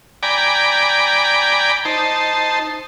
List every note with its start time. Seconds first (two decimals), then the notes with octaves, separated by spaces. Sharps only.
0.23 D5 G5 G#5 A#5 B5 D6
1.85 D#4 C5 A5